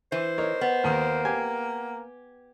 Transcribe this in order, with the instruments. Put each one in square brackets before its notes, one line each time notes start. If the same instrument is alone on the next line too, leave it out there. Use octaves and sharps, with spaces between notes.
[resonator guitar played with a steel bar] E3 [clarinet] C5
[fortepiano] D#4 A#4 C#5
[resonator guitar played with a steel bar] B3
[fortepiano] D#2 D#3 [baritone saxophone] A#3
[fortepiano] G4 G#5